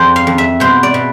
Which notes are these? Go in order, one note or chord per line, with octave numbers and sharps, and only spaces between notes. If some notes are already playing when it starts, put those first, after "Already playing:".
Already playing: F2 C5 D5
F5
F2
E5
B2 C5
D5
B2